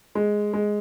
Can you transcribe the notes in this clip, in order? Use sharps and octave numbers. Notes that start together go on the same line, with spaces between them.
G#3
G#3